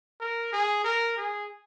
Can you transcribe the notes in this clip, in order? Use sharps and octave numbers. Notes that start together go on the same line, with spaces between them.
A#4
G#4
A#4
G#4